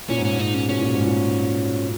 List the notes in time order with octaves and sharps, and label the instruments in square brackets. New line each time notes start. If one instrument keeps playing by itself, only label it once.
[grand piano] A#2 [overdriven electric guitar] C#4
[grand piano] G#2
[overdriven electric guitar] C#4
[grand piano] G#2
[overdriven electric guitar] D#4
C#4
[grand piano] B2 [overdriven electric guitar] C#4
[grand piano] A#2
G#2
A#2